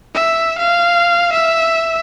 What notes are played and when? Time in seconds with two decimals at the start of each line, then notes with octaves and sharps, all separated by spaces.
0.15 E5
0.59 F5
1.33 E5